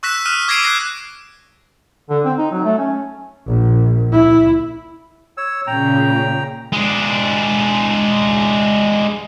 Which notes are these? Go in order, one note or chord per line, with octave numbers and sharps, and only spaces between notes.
C#6 E6 F#6 A#6 B6 E7
D#6 F6 F#6 D#7 E7
D6 G#6 A#6 C7 D7 D#7
F#6 A#6 C7
D3
C4
D#4
F#3
A3
C#4
A#1
E4
C#5 E6
A#2 C#3 G5 A#5
G#3 D4